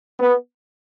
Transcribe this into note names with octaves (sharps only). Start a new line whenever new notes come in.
B3